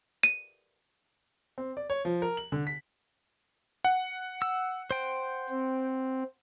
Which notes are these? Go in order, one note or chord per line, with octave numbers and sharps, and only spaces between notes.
D#7
C4
D5
C#5
F3
A#4
F#7
D3
B6
F#5
E6
C5 G5
C4